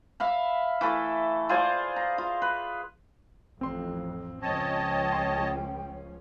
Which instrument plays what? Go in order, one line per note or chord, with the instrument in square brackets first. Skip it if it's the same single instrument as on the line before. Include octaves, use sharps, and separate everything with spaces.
[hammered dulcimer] E5 F5 B5
E3 A3 A4
F4 G#4 C5 D5
A#5
F4
B4
[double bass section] A1 F2 [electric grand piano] C4 C6
[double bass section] C#2 F3 C#4 [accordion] C#5 D#5 A5 [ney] G5
[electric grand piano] C6